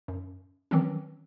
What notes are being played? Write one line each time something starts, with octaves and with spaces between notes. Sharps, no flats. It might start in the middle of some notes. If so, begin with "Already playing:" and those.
F#2
D#3 E3 F#3 C4 C#4